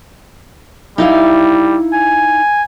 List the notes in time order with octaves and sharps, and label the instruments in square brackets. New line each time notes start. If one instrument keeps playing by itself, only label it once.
[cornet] G3 [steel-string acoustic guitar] D#4 E4 F5
[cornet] G#5